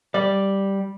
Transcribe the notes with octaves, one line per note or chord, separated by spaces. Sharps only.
G3 D5